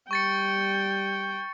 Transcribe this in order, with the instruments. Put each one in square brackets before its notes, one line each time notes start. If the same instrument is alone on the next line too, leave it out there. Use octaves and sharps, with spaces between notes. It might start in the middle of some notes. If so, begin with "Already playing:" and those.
[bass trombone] G3 [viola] G5 [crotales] C#6 A6 C#7